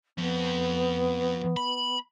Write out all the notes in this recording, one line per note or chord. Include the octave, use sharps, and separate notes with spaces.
F2 B3
B5